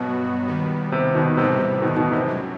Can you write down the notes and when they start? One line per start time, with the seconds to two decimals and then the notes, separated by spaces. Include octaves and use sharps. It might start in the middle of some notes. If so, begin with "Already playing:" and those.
Already playing: G2 B2 F#3 B3 F#4
0.47 D#2 D#3 G3 B3
0.92 C3
1.15 B2 D#3
1.37 A2 C3 E3 G3 B3
1.60 C3
1.82 B2 D#3
1.96 B2 D#3
2.12 C3
2.26 F#2 F#3